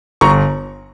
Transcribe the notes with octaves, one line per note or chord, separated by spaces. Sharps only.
G1 A#5 C#6